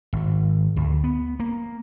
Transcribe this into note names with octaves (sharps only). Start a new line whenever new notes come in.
G#1
D2
B3
A#3